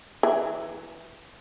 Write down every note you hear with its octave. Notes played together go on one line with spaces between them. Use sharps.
E3